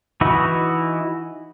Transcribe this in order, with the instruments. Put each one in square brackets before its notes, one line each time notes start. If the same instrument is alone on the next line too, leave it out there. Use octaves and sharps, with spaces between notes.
[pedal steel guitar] E3 D#4 E4 F#4